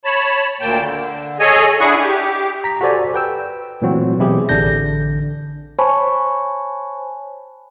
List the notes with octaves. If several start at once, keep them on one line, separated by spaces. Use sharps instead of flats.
C#5 A5 B5
D2 A#2 A#3 G5 A5
D3
G#4 A4 C#5 D#5 G#5
D4 E4 G#4 F#5 C#6
G4
A#5 B6
F#4 G4 A4 C5 D5 G#5
B4 G5 E6
A#2 E3 F#3 A3 C4 F#4
B2 E3 C4 E4 G4 G#4
A1 D3 D4 G6 A#6
C5 C#5 G#5 A5 B5 C#6